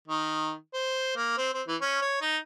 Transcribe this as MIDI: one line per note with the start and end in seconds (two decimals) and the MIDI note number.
0.08 0.54 51
0.74 1.13 72
1.16 1.33 58
1.37 1.51 60
1.54 1.62 60
1.67 1.76 52
1.81 2.00 61
2.02 2.18 73
2.21 2.37 63